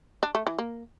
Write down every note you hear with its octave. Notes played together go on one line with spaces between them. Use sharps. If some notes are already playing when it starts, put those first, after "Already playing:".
D4
A3
E3
A#3